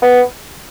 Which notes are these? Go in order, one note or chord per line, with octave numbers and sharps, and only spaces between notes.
B3